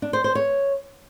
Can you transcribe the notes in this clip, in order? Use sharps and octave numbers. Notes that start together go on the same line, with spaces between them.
D4
C5
C5
C#5